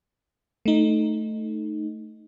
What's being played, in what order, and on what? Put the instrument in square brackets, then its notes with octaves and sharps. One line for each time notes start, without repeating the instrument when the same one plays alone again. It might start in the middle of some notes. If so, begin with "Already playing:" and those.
[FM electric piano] A3 D#4